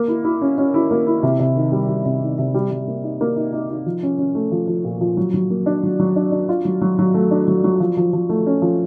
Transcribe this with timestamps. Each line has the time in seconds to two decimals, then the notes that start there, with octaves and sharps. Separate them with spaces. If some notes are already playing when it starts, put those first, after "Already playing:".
Already playing: A#3
0.08 E4
0.24 E4
0.42 C#4
0.58 C#4
0.74 E4
0.91 A#3
1.07 E4
1.23 C3
1.40 C3
1.56 D#3
1.72 G3
1.89 G3
2.05 C3
2.22 D#3
2.38 C3
2.54 G3
2.71 G3
2.87 A#3
3.04 D#4
3.21 A#3
3.36 D#4
3.53 D#4
3.70 D#4
3.86 F3
4.03 C#4
4.18 C#4
4.35 A3
4.52 F3
4.68 F3
4.85 A#2
5.01 F3
5.17 F#3
5.34 F#3
5.50 A#3
5.66 D4
5.83 F#3
6.00 F#3
6.16 D4
6.32 D4
6.49 F4
6.65 F#3
6.81 F#3
6.99 F#3
7.14 A3
7.31 D4
7.48 F#3
7.64 F#3
7.80 F3
7.97 F3
8.13 F3
8.29 A3
8.47 C#4
8.62 F3